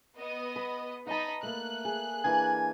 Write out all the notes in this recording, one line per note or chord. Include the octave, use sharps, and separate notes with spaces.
B3 D#5
B4
D#4 D#5 F#5 A5 B5
A3 A#3 F#6
G#4
E3 A#3 D4 G#5